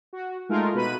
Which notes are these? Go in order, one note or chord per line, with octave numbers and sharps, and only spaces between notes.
F#4
G#3 A3 D#4 F4 A#4
B2 B4 B5 D#7